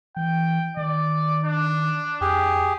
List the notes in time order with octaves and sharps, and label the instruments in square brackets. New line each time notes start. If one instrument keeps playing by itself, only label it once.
[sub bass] E3 [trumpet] G5
[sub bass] D#3 [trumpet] D5
[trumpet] D4
[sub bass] F2 [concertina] G4 G#4